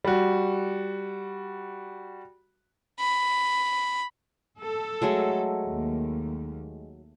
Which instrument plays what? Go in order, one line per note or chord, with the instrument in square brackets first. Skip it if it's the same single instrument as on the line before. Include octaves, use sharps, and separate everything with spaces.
[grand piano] G3 F#4
[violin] B5
[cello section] A4
[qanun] F#3 G#3 A3
[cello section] D#2